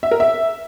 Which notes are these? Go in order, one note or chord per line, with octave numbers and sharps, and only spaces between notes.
E5
A#4
E5